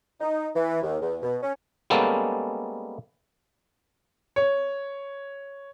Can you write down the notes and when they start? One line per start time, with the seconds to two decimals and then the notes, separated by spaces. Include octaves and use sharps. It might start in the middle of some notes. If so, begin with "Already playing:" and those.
0.21 D#4
0.55 E3
0.82 D#2
1.01 E2
1.22 B2
1.42 C#4
1.90 G3 G#3 A#3 B3 C#4 A4
4.36 C#5